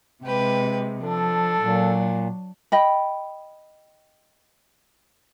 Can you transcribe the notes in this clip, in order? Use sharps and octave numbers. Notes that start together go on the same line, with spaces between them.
C3 G#3 G4 B4
F3 D4 A4
A#2 F#3
D#5 G5 B5